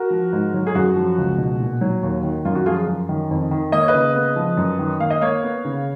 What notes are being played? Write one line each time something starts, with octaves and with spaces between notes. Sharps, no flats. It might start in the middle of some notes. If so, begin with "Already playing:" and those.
Already playing: F#4 A#4
F3
G#2
F#3
G#4
F#2 F#4
F3
C#2
B2
A#2
F#3
D#2
D#3
F#2 F4
F#4
F3 F4 G#4
F#2
D#3
F2
D#3
A#3 D#5
C#5
B4 D#5
C#3
B3
F3
F#2
D#3
A#3 F5
D#5
A#3 C#5 F5
B3
C#3